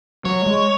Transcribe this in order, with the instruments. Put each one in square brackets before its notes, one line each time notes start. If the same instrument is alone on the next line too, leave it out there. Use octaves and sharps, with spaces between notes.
[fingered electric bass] F#3 [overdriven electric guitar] C#5
[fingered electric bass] G#3